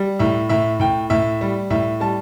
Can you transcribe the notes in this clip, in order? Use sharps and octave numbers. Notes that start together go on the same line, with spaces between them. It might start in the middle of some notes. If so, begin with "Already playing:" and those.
Already playing: G3
A2 E5
A2 E5
A2 G5
A2 E5
G3
A2 E5
G3 A5